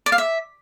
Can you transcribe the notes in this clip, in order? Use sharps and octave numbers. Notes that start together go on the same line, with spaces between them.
D5
F5
E5